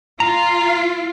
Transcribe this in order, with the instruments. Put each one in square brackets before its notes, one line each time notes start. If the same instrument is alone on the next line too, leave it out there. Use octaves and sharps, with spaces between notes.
[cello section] F4 [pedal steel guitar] A#5